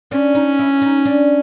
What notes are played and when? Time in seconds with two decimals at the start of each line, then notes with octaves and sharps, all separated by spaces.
0.11 C#4 D4
0.35 D#4
0.59 E4
0.82 D#4
1.05 D4